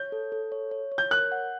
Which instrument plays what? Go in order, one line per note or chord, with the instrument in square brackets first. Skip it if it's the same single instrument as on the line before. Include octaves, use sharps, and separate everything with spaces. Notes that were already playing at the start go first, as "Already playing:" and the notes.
Already playing: [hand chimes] C#5 [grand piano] G6
[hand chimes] A4
A4
C#5
C#5
C#5
[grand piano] G6
[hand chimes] A#4 [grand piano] F#6
[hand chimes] F#5